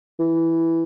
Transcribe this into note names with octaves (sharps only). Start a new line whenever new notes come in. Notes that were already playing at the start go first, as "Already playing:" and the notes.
E3